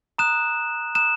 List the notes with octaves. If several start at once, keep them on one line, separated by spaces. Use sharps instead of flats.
A#5 D#6 F#6 E7
A#5 D#6 F#6 E7